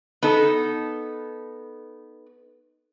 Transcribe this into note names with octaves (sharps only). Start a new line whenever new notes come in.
B3 D#4 A4